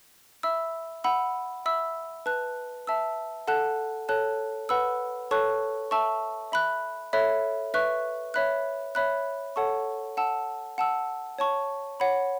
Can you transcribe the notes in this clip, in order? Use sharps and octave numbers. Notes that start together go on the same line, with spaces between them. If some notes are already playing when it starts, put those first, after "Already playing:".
E5 B5 E6
F#5 B5 E6
E5 B5 E6
B4 A5 F#6
E5 A5 E6
A4 F#5 A5 F#6
A4 C#5 A5 F#6
B4 F#5 B5 E6
A4 C#5 A5 C#6 F#6
E5 A5 C#6 E6
E5 B5 F#6
A4 C#5 E5 B5 F#6
B4 E5 C#6 F#6
C#5 E5 B5 F#6
C#5 E5 B5 F#6
A4 C#5 F#5 A5 C#6
F#5 A5 E6
F#5 A5 E6
C#5 A5 C#6
C#5 F#5 B5